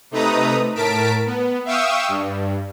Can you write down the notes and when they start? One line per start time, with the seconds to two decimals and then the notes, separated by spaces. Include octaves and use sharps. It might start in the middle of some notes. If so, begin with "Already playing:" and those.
0.11 C3 A3 D#4 B4 A#5 D#6
0.75 A2 A#4 A5 B6 D7
1.26 B3
1.65 E5 F5 G5 C#6 D#6 E6
2.08 G2